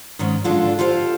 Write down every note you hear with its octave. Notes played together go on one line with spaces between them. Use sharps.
G#2 D#3 C#4
D3 G#3 D4 F4 A4
F4 G4 A4 C5 F5